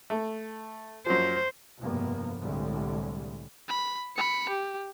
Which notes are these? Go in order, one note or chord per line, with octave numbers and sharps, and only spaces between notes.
A3
F#2 F3 C5
F1 G2 B2 F3 A#3 B3
C2 A2 D3 G3 G#3
B5
B5 C#7
G4